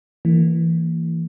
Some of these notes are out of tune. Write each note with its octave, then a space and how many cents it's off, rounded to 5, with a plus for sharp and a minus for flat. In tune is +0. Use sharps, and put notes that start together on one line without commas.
E3 +5 A#3 -30